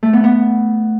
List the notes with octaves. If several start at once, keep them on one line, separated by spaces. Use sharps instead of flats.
A3
B3
B3